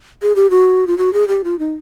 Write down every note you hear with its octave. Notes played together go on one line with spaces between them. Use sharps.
G#4
G4
F#4
F4
F#4
G#4
G4
F4
D#4